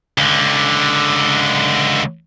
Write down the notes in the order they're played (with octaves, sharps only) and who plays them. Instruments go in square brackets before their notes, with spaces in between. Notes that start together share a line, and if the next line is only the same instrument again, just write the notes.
[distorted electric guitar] C#2 D3